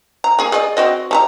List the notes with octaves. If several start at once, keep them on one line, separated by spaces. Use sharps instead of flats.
A#5
A#3 G#4
G#4 D5 D#5
C4 F#4 D#5
G3 A5 A#5